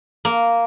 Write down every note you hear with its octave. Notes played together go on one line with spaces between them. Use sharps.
A#3